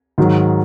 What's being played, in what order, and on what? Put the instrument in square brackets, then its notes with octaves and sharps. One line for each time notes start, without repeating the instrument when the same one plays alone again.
[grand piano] G#2 D#3 F#3